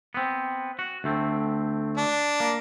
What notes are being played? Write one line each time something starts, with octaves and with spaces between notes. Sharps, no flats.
B3 C4
F#4
D2 A3 C4
D4
A#3